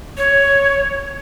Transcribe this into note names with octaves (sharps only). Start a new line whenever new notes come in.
C#5